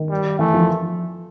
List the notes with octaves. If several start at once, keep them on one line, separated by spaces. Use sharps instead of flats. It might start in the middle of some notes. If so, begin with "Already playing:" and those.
Already playing: D#3
G3
E3 A3
F3